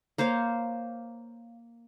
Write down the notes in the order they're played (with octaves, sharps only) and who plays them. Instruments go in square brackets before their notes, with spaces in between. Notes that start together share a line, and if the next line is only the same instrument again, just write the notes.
[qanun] A#3 C5 C#5 F5